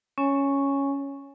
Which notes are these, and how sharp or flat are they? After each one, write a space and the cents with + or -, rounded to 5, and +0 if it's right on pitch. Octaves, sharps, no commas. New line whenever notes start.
C#4 +0 C#5 +0 G#5 +0